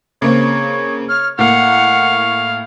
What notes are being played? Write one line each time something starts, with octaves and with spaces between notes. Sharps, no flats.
C#3 A#3 C4 C#5
C#5 F6
A2 A#3 F5 F#5 C#6